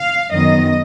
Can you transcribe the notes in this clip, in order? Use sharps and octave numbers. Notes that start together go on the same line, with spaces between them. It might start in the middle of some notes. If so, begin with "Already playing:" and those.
Already playing: F5
F#2 D#3 F#3 B3 D#5